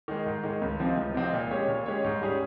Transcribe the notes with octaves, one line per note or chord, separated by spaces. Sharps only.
D#3 G#3
G#2
D#3 G#3
C#2
C3 F3 C4 D#4
C#2
C3 F3 C4 D#4
A#2
G#3 C#4 G4 C#5
A#2
G#3 C#4 G4 C#5
G#2
G3 C#4 G#4